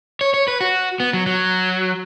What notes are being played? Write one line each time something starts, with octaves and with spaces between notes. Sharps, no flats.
C#5
C#5
B4
F#4
B3
F#3
F#3